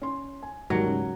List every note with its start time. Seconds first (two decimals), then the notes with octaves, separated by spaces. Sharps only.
0.02 C#4 C6
0.43 G#5
0.70 D#2 G#2 F#3 G3 A#4 C#7
0.87 C#3